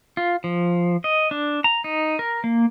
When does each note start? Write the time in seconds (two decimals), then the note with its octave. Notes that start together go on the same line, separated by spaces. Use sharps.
0.17 F4
0.44 F3
1.04 D#5
1.31 D4
1.64 A#5
1.84 D#4
2.19 A#4
2.44 A#3